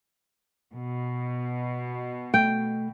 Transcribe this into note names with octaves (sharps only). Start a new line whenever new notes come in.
B2
A3 G5